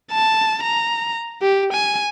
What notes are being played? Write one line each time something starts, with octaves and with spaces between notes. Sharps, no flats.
A5
A#5
G4
G#5